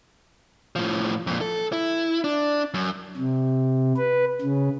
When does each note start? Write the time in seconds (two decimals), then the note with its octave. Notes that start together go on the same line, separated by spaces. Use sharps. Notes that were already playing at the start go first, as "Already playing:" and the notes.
0.76 A2 F3
1.27 F2 A#2
1.41 A4
1.72 E4
2.24 D4
2.74 F#2
3.16 C3
3.97 B4
4.41 C#3